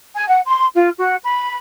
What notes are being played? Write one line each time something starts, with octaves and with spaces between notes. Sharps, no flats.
G#5
F#5
C6
F4
F#4
B5